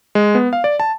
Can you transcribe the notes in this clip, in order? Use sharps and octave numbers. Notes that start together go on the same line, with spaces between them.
G#3
B3
F5
D5
A5